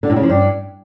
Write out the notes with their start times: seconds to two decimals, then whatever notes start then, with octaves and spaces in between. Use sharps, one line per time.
0.03 D3
0.10 A2
0.16 C#3
0.23 F3
0.30 G2